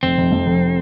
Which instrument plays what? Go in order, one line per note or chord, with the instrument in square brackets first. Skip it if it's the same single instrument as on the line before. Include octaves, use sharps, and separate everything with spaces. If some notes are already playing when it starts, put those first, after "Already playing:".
[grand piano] F1 [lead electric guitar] C4
[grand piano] F1
F2
F1